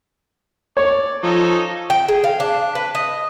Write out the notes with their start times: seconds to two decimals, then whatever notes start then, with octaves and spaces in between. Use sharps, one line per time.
0.77 C#5 D5
1.23 F3 C#4 D#4 A4
1.90 G5
2.08 G#4
2.24 F5
2.40 D4
2.75 B4
2.95 D#5